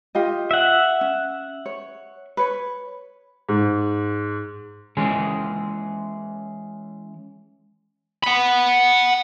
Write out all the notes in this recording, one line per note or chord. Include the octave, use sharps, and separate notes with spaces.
F4 G4 D#5
E5 F#5
C#4
C#5
B4 C#5
G#2
E3 G#3 C#4 G#4
F#5 B5